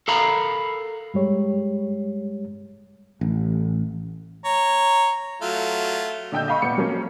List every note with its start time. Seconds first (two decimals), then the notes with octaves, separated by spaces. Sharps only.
0.08 A4 A#4 F5 A#5 B5
1.14 G2 G3 G#3 G4 C#5
3.21 A1
4.45 C#5 A#5
5.42 F#3 A3 F4
6.32 A#2 D3 D#5 G5 E6 G6
6.48 D#5 F5 B5 C#6
6.62 A#2 B3 C#7
6.77 F3 F#3 A#3 C#4